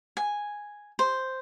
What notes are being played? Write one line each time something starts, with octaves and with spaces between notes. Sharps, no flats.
G#5
C5